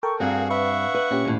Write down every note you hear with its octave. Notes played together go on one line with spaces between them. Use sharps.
A4 A#4 G5 C#6
G2 C4 F#4 G#4 F5
B4 E5 F#5 C#6
B4
A#2 C#4 G4
D#2 A2